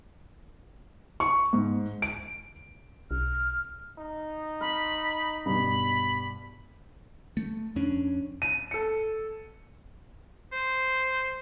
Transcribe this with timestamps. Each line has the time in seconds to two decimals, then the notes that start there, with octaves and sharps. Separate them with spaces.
1.20 C#6
1.53 G#2
2.02 D7
3.11 B1 F6
3.98 D#4
4.61 B5 C6 F6
5.46 G2 B2 B5
7.37 A3
7.76 F2 C#4 D4
8.42 D#7
8.71 A4 C#7
10.52 C5